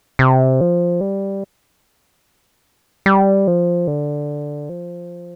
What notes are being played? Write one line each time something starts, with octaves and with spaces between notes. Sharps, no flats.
C3
F3
G3
G3
F3
D3
F3